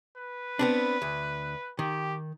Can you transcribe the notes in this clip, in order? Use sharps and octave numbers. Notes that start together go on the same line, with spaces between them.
B4
B3 C4 D4
D2
D#3 G4